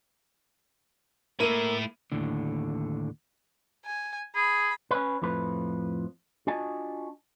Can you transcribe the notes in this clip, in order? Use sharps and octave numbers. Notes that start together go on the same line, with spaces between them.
A3 A#3 E4 D#7
D#2 A2 D3
G#5
G#4 B5
C#4 B4
F2 A2 F3 B4
D4 F4 F#4 D#5 G#5 A5